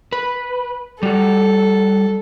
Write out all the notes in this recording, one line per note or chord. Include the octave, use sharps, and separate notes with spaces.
B4
G3 F#4 A4